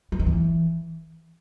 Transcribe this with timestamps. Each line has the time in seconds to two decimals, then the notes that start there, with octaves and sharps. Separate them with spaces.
0.12 E3
0.20 D#3
0.27 E3